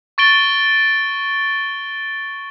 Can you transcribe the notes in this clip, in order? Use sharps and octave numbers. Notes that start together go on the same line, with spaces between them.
C#6 A6 D7 G7